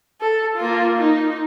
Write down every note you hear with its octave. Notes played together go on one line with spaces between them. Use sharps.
A4
A#3 F4
D#4